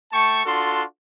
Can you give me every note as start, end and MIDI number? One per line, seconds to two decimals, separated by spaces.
0.12 0.41 57
0.12 0.41 79
0.12 0.41 81
0.12 0.41 85
0.46 0.82 62
0.46 0.82 65
0.46 0.82 66
0.46 0.82 69
0.46 0.82 84